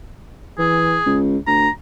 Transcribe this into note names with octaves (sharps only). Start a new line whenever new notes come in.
E3 G#4
C#2
D2 A#5